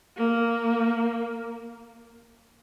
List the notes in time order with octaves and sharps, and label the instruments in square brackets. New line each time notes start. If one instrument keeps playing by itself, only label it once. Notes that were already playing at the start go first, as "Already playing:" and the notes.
[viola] A#3